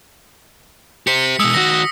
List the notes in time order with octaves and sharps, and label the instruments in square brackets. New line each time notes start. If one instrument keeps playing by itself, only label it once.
[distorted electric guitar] G4 C5 [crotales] B6 C#7
[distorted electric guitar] B2 G#3 [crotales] D#6 E6 C#7
[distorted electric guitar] D#3 F#4 [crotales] A#6